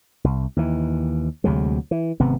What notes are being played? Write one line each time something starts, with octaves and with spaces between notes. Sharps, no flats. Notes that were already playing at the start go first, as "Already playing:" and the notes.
C2
D#2 E3
D2 C3 F#3 G#3
E3
G#1 C3 B3